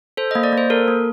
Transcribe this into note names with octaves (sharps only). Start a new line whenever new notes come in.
A4 C5
D#5
A#3
D5
A#3 C5
A4 A#4
A#3